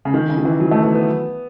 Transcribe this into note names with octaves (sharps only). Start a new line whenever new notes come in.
C#3
D#3
C#3
D#3
E3
F#3
A3
B3
B3